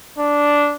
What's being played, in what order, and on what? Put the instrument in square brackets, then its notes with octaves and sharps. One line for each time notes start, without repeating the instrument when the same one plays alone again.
[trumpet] D4